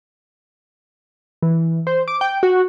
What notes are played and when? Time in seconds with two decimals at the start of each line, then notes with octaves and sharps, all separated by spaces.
1.42 E3
1.87 C5
2.08 D6
2.21 G5
2.43 F#4